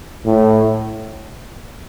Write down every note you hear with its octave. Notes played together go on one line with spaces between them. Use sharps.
A2